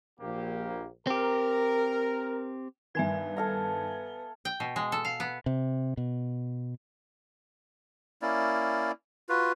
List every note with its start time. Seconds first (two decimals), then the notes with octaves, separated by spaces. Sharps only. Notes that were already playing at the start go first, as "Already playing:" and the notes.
0.20 A#1 A#3 G4
1.07 C4 G4 A#4
2.95 G2 D#3 B3 E5 G#5 G#6
3.37 A4 F5 A#5
4.45 G5
4.60 B2
4.76 G#3
4.92 A4
5.05 F5
5.20 B3
5.46 C3
5.97 B2
8.22 A#3 C#4 E4 D5
9.29 F4 F#4 B4